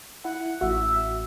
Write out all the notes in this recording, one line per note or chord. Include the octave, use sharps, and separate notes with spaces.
E4 F#5
A1 F#4 E5